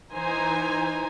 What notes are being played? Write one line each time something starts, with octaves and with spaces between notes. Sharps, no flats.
E3 D#4 C5 G#5 A#5